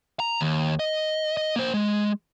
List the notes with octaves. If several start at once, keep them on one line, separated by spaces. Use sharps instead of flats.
A#5
D#2
D#5
D#5
A#3 C5
G#3